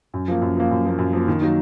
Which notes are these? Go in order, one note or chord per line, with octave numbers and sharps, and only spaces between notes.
F#2
F3 A#3
F#2
F3 A#3
F#2
F3 A#3
F#2
F3 A#3
D#3
F#3 A#3 D#4